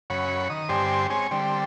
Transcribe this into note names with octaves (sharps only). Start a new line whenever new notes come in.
F#2 C#3 C#5 F#5 B5
D#3 D#6
G2 D3 C4 G4 C5 G#5
G#3 C4 C#5 G#5
D3 G3 C4